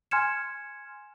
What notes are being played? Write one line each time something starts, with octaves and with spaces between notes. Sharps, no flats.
G#5 C6 F6 G#6 C#7 E7